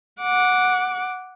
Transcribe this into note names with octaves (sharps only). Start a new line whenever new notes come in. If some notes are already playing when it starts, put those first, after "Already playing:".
F#5 D6